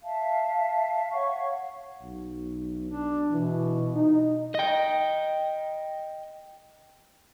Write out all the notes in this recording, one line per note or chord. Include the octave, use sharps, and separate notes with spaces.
E5 F5 A5
C#5 F5 F#5 C#6
B1
D4
B2 E3
D#4
D#5 G5